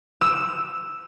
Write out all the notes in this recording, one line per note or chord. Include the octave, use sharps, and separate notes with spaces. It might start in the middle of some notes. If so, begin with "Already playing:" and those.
E6 E7